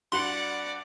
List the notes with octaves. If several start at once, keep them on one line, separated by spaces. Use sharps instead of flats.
G2 F#4 D5 F#5 C6 F#7